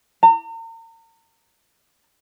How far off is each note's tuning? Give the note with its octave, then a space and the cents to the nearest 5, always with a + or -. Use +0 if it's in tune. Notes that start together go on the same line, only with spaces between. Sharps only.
A#5 -40